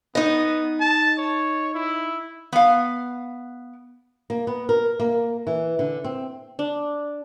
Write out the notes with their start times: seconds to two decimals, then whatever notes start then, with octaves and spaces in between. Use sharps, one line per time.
0.15 B3 D#4 D#5
0.80 A5
1.19 C#5
1.75 E4
2.53 B3 F5
4.30 A#3
4.47 B3
4.69 A#4
5.00 A#3
5.47 E3
5.79 D3
6.04 C4
6.59 D4